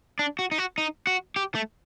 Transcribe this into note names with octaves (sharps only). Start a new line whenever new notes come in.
D4
F#4
D#4
F#4
D#4
F#4
G4
A3